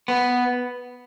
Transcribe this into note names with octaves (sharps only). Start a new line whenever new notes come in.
B3